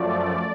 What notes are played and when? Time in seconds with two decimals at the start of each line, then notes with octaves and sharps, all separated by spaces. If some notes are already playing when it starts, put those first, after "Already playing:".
Already playing: F#2 F3 A3 D5